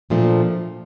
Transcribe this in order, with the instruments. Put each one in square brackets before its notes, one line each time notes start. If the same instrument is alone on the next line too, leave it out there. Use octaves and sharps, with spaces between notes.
[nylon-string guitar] A#2 F3 A3 D4